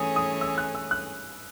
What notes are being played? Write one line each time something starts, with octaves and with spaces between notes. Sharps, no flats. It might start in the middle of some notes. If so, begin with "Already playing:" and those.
Already playing: E3 A3 C#4 G#4 D#6
D#6
E6
F#6
E6
F#6